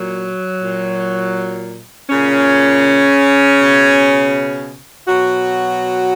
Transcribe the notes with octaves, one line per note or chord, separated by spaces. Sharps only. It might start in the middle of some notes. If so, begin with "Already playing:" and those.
Already playing: A#2 F#3
A#2
A#2 C#3 C#4
B2
B2 F#3 F#4